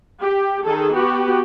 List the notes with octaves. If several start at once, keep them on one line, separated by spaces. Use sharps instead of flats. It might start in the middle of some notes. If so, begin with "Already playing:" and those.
G4
D#3 G#4 A4
B3 F#4 G4